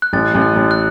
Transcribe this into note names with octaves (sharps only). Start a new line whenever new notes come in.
F#6
A1 A6
A1
F#6
A1
F#6